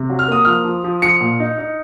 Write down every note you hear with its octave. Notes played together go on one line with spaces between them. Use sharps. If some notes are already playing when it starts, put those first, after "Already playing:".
Already playing: C3
F#3
F6
A#3 D#6
F3 F6
F3
F3
F3 C#7
A#2
D#4
D#4